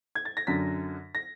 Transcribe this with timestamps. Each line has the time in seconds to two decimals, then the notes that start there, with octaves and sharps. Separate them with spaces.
0.15 G#6
0.25 A6
0.37 A#6
0.47 F#2 D3 B6
1.15 A#6